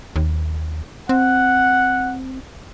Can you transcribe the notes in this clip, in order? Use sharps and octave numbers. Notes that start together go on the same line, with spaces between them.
D#2
C4 F#5